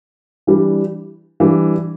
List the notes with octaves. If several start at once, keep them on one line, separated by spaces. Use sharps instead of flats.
E3 G3 D4
E3 G3 D4